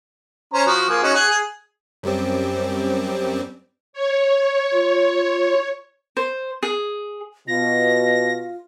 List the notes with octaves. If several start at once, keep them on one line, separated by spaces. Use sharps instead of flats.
C#4 C5 A#5
F3 F#4
F3 A#3 G#4
C#4 D#4 F#4
G#4 F#5 G#5
G#4
F#2 G3 C4
C#5
F4
C5
G#4
B2 F4 A#6